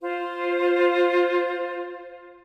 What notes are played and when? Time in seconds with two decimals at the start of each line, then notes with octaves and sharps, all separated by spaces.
0.02 F4 C5